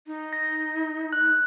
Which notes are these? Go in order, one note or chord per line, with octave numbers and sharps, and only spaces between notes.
D#4
A#6
F#6